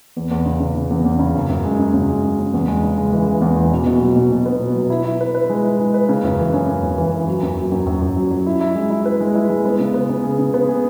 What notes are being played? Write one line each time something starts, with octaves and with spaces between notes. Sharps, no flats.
E2
E2
C#3
C#3
C#3
E2
E2
C#3
F#2
F#2
G#3
C#3
F#2
G#3
F#2
C#3
E2
G#3
C#3
G#3
E3
E3
E2
E3
B2
B2
F#3
B2
B2
B3
B2
F#3
E4
E4
B4
B4
G#3
E4
G#3
B4
C#3
F#2
E3
C#4
F#2
F#2
E3
E3
F#3
F#2
F#3
F#2
F#2
F#2
F#3
F#3
E4
E4
G#3
E4
B4
G#3
E4
G#3
B3
C#3
B3
C#3
G#4
C#3
B3
G#4